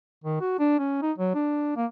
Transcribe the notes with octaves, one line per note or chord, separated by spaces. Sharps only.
D#3
F#4
D4
C#4
D#4
F#3
D4
A#3